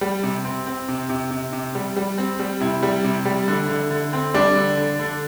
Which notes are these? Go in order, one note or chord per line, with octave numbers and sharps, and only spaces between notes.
G3
C3
C4
C4
C3
C3
C3
C3
G3
G3
C4
G3
C3 E4
G3
C3
G3
D3
D3
D3
C4
G3 D4
D3
D3
D3